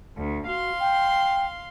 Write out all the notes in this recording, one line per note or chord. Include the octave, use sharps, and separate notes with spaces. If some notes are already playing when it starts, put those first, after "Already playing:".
D2
F#4 F5 C6
G5